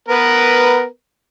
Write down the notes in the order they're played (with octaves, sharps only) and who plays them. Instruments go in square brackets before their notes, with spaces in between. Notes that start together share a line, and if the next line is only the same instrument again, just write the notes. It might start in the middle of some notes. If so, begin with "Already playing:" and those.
[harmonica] B3 A#4 B4